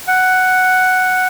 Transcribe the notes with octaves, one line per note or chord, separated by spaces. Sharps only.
F#5